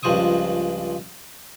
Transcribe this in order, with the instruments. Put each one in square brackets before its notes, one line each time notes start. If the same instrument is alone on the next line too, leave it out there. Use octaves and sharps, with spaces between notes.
[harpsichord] C#2 G2 F3 C5 C#6 D#6